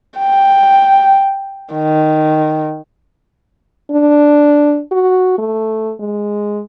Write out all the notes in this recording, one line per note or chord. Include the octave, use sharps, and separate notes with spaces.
G5
D#3
D4
F#4
A3
G#3